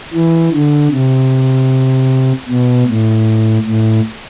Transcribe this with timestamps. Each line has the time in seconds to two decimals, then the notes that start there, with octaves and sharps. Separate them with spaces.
0.14 E3
0.53 D3
0.92 C3
2.48 B2
2.88 A2
3.65 A2